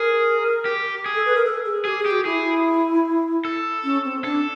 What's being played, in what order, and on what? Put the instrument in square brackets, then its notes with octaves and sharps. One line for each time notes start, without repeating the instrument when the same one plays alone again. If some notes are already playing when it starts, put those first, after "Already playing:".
Already playing: [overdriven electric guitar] G#4 [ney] A#4
[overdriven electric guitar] G4
G#4
[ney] A4
B4
A#4
A4
G#4
[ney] G4 [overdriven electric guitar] G#4
[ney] G#4
[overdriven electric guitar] G4
[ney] F#4
[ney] E4 [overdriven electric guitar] G#4
[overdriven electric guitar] A4
[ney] C#4
C4
[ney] D4 [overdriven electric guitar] A4